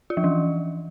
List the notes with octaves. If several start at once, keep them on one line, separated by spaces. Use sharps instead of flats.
F4
F3
E3